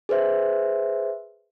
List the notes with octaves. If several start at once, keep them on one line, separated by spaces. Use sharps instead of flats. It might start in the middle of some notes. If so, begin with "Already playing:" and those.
G#4 B4 C5 E5